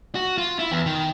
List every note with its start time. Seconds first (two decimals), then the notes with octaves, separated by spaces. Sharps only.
0.15 F#4
0.38 F4
0.59 E4
0.72 E2
0.86 D#3